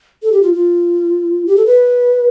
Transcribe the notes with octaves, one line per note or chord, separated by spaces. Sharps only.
A4
G4
F4
F4
G4
A4
B4